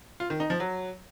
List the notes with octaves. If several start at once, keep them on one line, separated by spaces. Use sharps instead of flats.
F4
D#3
D#4
F3
F#3